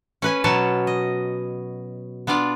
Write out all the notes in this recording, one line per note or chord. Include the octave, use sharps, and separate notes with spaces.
C#4 B4 G#5
B2 F#3 B3 C#4 A5
D#5
B3 D4 F4 D5 F5